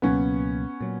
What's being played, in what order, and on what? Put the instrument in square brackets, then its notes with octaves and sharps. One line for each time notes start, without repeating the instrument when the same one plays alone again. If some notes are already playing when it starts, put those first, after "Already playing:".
[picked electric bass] C#2 B2 F#3 A#3 [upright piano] B3 C#4
[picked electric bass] A#2 F#3